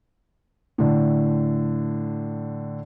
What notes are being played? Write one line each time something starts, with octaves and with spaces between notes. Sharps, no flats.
A2 D3